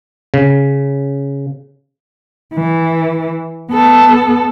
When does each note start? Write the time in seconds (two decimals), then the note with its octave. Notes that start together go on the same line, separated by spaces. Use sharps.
0.34 C#3
2.54 E3
3.70 B3 A4